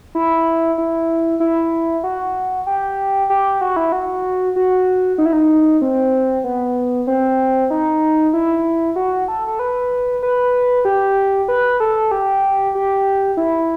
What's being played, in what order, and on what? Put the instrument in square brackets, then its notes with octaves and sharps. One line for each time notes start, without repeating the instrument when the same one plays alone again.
[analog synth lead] E4
E4
E4
F#4
G4
G4
F#4
E4
F#4
F#4
D#4
E4
D#4
C4
B3
C4
D#4
E4
F#4
A4
A4
B4
B4
G4
B4
A4
G4
G4
E4